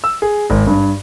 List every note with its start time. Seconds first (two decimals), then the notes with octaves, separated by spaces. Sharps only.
0.04 E6
0.22 G#4
0.50 G#1
0.67 G2